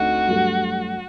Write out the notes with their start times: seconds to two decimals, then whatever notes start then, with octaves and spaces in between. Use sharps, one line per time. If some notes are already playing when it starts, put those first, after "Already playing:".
Already playing: D2 D3 A3 C4 D#4 F#4
0.27 G2 F#3 A3